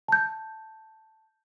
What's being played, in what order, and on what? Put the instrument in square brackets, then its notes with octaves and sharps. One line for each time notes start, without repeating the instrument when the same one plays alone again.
[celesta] A5 G6